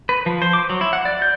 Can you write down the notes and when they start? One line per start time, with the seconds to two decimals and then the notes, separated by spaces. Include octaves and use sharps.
0.09 B4
0.26 F3
0.42 C5
0.53 D6
0.70 F#3
0.81 E4
0.93 F#5
1.05 D5
1.22 G6